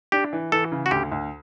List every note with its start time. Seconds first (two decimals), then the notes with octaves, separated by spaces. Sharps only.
0.12 D4 G4
0.33 E3
0.52 E3 A4
0.72 C#3
0.86 F#4
0.91 D2 G4
1.12 D2